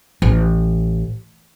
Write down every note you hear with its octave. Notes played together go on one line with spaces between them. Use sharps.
A1